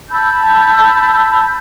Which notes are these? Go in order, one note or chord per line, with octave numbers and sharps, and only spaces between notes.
A5 B5 E6 G6